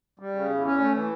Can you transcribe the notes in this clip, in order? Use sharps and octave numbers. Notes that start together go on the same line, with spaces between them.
G3
C#3
E2
C#4
A3
E3